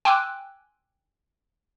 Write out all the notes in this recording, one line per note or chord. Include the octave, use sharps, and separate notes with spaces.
G5 G#5 C6 D6 E6 F#6